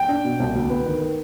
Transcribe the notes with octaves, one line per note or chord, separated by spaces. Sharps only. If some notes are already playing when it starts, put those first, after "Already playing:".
Already playing: G5
D4
B2
C2
D2
B3
D#3
D#3